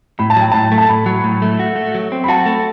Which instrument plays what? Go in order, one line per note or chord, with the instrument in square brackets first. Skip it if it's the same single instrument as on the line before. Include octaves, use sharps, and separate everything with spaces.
[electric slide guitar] A2 [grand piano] B5
[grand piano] A5
[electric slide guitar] F#3 [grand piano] G5
[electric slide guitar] A2 [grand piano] A5
[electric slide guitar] A3
[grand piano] A5
[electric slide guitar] A2 [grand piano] B5
[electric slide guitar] F#3
A2
A3
F#4
A3
F#3
C4
[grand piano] B5
[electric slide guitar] F#4 [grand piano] A5
[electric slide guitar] A3